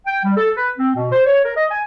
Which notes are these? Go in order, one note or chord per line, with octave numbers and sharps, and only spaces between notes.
G5
G3
A4
B4
C4
B2
C5
C#5
A#4
D#5
G#5